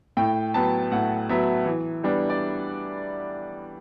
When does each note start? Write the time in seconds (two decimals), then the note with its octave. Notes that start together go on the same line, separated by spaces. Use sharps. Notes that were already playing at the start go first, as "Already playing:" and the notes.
0.17 A2 G5
0.54 F#3 B3 A5
0.91 A2 F#5
1.29 F#3 B3 E5
1.66 E3
2.04 G3 B3 D4
2.30 D5